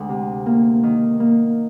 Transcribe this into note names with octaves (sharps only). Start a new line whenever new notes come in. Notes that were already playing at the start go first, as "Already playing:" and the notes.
Already playing: D2 G#3 F#5
C3
A#3
D#3
A#3